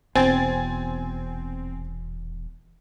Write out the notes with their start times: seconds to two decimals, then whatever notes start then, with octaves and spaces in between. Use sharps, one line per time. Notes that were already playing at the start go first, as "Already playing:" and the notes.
0.15 D#1 E2 B2 C4 G#5 A6